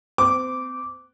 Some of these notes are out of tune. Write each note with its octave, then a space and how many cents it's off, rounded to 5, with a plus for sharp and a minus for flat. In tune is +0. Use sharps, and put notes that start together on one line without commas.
C4 -30 D6 -10